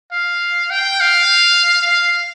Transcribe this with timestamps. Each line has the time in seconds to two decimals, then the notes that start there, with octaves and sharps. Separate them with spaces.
0.12 F5
0.70 G5
1.00 F5
1.88 F5